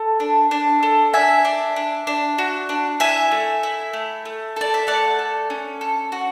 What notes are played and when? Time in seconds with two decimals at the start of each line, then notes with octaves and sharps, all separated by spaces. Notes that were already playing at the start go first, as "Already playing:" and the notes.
Already playing: A4
0.20 D4
0.51 D4
0.83 A4
1.14 D4 E5 G#5
1.45 D4
1.76 D4
2.07 D4
2.38 F#4
2.69 D4
3.00 E4 E5 G#5
3.31 A3
3.63 E4
3.93 A3
4.25 A3
4.56 A4 D5
4.74 E5
4.87 A3 D5 F#5
5.19 A4
5.50 C#4
5.81 A4
6.12 F#4